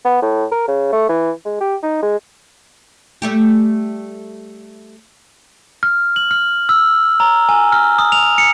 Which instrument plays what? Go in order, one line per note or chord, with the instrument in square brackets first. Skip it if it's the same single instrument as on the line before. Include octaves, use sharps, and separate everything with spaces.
[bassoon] B3
A2
A#4
C#3
A3
E3
G#3
G4
D#4
G#3
[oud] G3 A3 G4
[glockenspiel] F6
F#7
F6
E6
A#5
G#5
F6
D#6
F7
C#7